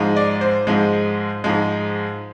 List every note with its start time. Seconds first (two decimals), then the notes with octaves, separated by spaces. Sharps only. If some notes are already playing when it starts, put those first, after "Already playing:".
Already playing: G#2 F3 G#3
0.16 D5
0.41 C5
0.67 G#2 F3 G#3
1.44 G#2 F3 G#3